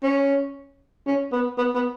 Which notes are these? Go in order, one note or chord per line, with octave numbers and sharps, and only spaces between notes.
C#4
C#4
B3
B3
B3